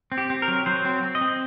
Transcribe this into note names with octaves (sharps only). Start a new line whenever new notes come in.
C4
G4
C4
A#4
F#3
F#3 C5
C4
C4
D#5
C4